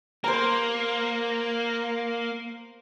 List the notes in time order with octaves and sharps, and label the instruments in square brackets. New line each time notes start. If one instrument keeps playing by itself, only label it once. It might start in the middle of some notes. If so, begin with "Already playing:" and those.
[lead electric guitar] A#3 [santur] C5 A#5